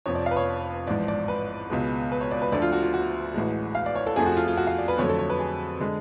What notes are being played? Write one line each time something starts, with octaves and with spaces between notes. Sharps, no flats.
F1 F2 F3 C#5
D5
F5
B4
C#5
A1 G#2 F3 D5
D5
B4
C#2 B2 G#3
B4
C#5
D5
B4
D2 D3 F3 D5
F4
F#4
F4
F#4
A1 A2 G#3
F5
D5
C#5
A4
F2 F3 A3 G#4
F#4
F4
F4
F#4
F5
D5
B4
F2 D3 F#3 A3 C#5
A4
C#5
B4
G#4
D3 G#3